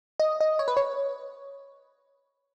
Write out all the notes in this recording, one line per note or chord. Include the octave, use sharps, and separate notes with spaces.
D#5
D#5
C#5
B4
C#5